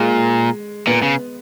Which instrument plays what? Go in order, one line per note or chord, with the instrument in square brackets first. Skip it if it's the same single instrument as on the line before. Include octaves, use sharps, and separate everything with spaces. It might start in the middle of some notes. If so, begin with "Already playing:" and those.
Already playing: [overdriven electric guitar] A#2 [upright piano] G#3
[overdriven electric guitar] A#2 [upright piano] B3
[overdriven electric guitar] C#3